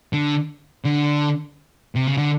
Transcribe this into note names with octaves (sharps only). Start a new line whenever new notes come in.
D3
D3
C3
C#3
D3